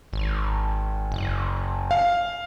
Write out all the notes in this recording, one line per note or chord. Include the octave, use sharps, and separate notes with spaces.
G#1
F#1
F5